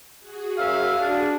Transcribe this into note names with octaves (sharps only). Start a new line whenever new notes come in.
F#4 G#4
F#2 E5 F5
D4